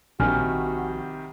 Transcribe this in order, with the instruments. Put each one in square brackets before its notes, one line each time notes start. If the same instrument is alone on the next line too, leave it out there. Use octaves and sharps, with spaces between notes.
[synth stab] A#1 [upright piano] C3 D#3 G3 [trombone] F#4 [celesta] G#5 F6